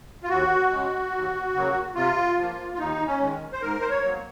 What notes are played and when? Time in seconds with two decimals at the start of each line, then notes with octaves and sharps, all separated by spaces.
0.23 F4
0.29 D#2 F#4
0.71 C#3 G#3
1.12 D#2
1.54 C#3 F#3 A#3
1.95 C3 F4
2.37 F3 A#3
2.73 F4
2.79 D#2 D#4
3.07 C#4
3.20 D#3 G#3
3.53 C5
3.62 G#2 A#4
3.81 C5
3.89 C#5
4.04 F#3 A#3